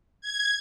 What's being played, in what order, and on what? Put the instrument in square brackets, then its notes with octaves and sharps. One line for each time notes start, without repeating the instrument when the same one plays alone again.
[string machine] G#6